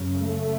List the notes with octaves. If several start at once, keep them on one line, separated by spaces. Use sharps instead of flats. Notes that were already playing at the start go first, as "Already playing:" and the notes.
Already playing: F#2 C#3
A3